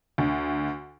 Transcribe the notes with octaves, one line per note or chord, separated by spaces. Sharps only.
D2